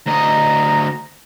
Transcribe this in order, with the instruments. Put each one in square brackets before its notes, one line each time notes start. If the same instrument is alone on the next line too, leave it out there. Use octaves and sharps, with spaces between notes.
[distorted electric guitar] D2 D#5 [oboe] A#5